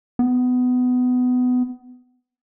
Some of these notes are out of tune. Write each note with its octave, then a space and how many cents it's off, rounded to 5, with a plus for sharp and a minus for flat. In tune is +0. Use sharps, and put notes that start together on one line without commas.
B3 +20